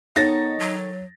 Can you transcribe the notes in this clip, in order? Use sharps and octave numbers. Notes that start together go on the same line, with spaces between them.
D#3 B3 D#4 A4 C#5 A6 A#6
F#3